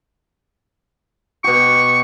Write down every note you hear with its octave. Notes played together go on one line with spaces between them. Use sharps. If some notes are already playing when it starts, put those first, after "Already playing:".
B2 G4 C#6